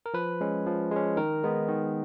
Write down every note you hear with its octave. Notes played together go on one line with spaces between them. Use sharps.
A#4
F3 B4
G#3 C#4
F3
G#3 C#4
D#3 A#4
G#3 B3 D#4
D#3